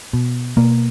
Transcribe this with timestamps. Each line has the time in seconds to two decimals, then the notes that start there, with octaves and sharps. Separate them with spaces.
0.13 B2
0.57 B2 A#3